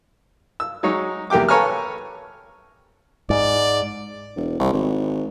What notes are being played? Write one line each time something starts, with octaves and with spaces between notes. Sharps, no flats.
E6
F#3 G#3 D#4 C#5
E2 A#3 G4 G5 D6
A4 B4 C#5 G#5 A#5 F6
G#2 D5
E1
C2
G#1